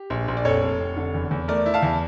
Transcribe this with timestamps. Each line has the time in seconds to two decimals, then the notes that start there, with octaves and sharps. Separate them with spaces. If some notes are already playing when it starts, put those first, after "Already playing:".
Already playing: G4
0.10 A#1
0.28 A#1
0.37 D5
0.45 F1 A4 C#5
0.62 F1
0.80 F1
0.97 D3
1.14 E2
1.31 E2
1.48 A3 A#4 D5
1.66 E4
1.74 F5 A5
1.82 E2